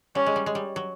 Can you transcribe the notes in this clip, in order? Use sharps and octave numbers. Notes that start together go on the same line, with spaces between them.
G3 C#4
G#3
G3
G#3
G3
F#3